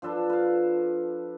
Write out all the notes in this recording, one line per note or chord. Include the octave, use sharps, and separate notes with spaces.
F3 D4 A4 B4
B4 F5